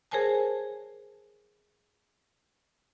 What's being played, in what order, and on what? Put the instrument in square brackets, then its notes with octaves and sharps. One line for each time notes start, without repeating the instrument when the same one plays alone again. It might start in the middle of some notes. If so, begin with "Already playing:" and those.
[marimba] G#4 A#4 C5 C#5 G#5 A5